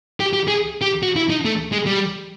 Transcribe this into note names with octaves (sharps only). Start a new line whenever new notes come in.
G4
G4
G#4
G4
F#4
E4
D#4
A3
G#3
G3